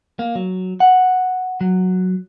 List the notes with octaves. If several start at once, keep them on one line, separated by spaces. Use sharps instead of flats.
A#3
F#3
F#5
F#3